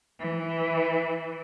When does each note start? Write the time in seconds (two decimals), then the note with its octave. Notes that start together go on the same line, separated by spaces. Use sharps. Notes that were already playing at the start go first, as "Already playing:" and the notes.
0.20 E3